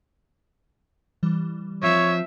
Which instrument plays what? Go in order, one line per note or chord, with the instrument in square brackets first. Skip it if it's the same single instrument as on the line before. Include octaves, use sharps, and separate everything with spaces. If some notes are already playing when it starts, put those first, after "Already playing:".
[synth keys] E3 G3
[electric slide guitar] F3 C4 [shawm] C#5 [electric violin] E5